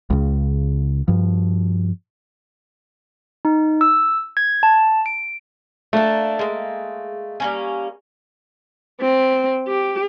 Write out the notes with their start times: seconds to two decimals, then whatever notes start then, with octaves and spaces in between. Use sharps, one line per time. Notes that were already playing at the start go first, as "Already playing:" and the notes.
0.10 C#2 C#3
1.08 G2 F3
3.45 D#4
3.81 E6
4.37 G#6
4.63 A5
5.06 D7
5.93 A3 A#3 D4
6.39 G#3 A#3
7.40 G3 A#3 C#4
9.01 C4
9.68 G4